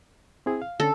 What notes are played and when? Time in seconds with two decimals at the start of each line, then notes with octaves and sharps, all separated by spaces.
0.46 C4 E4 G#4
0.62 F5
0.80 D3 C#4 A4